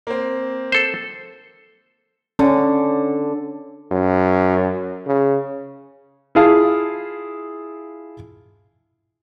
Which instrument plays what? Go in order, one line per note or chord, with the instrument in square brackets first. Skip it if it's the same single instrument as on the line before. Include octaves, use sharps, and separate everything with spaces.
[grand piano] A#3 C4
[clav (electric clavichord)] A4 C5
[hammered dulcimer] D3 [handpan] C#4
[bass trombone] F#2
C#3
[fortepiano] E4 F4 G#4 F5 A5